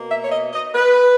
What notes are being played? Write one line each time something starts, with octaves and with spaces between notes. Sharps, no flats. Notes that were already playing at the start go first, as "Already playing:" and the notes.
Already playing: B2 A#3
E5
C#5
D#5
D#5
B4